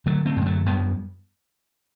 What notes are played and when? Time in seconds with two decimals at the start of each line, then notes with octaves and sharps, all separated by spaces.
0.06 D3 F#3 A3
0.26 A3 C4
0.36 F#2
0.41 G3
0.46 F#3 A3
0.66 F#2 G3 B3